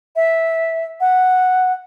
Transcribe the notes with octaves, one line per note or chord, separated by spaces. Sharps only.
E5
F#5